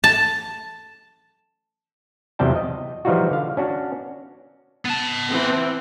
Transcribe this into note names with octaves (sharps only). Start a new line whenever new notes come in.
A5
E2 C3 F#3 G3 G5 A5
D#5
E3 F3 G3 D#4 F4 F#4
D3 F5
C#4 D4 F#4
B3 A5
E3 C4